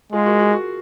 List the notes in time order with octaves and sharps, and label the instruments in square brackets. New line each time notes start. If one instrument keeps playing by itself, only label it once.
[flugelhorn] G#3 [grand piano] F4 G#4
[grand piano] F#4 A#4
F#4
F#4